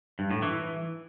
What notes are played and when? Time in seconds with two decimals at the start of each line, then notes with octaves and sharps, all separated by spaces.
0.19 G2
0.31 A2
0.42 E3